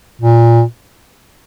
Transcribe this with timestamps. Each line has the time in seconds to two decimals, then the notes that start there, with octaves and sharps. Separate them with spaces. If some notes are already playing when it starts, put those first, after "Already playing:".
0.21 A#2